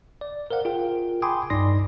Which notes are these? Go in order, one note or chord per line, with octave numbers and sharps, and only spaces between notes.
D5
A#4 C5 F5 F#5
F4 G#4 A#4 G5
G5 G#5 B5 C6 D6 D#6
C2 G2 D#4 D5 C6 A#6